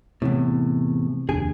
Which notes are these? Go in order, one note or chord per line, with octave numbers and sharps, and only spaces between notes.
E2 A2 C3
F1 D#2 D4 G#4 G#5